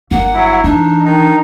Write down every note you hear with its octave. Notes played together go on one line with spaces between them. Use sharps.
G1 A#3 F#5
F#3 E4
E3 D4 D#4
D#3 D#4